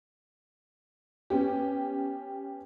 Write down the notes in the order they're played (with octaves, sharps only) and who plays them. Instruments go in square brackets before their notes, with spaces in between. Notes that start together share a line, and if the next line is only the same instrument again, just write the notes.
[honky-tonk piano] B3 C#4 G4